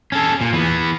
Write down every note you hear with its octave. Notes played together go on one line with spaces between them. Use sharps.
C#4 A4
A#2
E3 B3